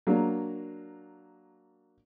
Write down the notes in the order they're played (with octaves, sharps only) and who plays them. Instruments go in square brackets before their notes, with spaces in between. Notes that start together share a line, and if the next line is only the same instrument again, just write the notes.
[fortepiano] F#3 A#3 D4